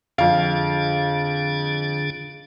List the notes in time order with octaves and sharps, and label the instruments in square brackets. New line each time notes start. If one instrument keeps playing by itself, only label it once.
[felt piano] F2 F5 [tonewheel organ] D3 D4 G#4